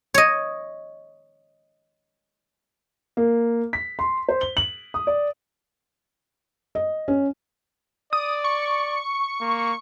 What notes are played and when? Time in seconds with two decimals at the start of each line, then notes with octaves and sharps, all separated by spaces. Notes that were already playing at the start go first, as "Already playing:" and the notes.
0.14 C#5 D#5
3.17 A#3
3.73 B6
3.99 C6
4.29 C5
4.41 G7
4.57 F#7
4.94 D#6
5.07 D5
6.75 D#5
7.08 C#4
8.13 D5 D#6
8.44 C#6
9.41 A#3